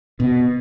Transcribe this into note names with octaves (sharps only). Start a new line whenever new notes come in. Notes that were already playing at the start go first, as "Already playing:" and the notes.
B2